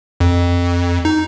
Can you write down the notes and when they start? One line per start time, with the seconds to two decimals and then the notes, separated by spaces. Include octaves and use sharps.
0.20 F2
1.05 D#4